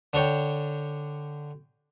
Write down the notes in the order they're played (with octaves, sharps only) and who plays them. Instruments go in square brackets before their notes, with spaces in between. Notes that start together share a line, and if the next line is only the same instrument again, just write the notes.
[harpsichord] D3 D4 C#5 G5